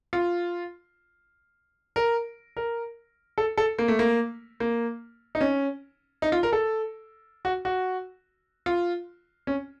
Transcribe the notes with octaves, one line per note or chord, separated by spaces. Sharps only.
F4
A#4
A#4
A4
A4
A#3
A3
A#3
A#3
D#4
C#4
D#4
F4
A#4
A4
F#4
F#4
F4
C#4